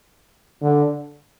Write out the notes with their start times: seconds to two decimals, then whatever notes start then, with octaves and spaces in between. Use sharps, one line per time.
0.62 D3